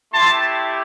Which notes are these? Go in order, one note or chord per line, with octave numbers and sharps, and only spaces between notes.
A3 E4 G4 A5 C6